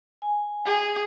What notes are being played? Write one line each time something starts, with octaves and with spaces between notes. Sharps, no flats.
G#5
G#4